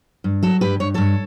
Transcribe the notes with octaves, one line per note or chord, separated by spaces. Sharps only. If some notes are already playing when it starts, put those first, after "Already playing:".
G2
F#3 F#4 A4
G2 G4 B4
G2 C#5
G2 A4 C#5